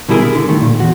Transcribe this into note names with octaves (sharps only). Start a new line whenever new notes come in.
B2 D3 G3 E4 G#4 A#4
E4
D3
D#3 A3
A#2
E2 F#4